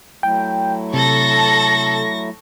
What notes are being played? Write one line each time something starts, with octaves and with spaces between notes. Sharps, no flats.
F#3 A3 E4 G5
C3 A4 C#6 A#6